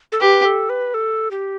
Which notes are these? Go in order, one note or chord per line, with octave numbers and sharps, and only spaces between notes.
A4
G4 B4
A4
B4
A4
G4